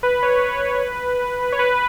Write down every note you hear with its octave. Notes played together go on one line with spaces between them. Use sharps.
B4
C#5
C#5
B4
C#5
B4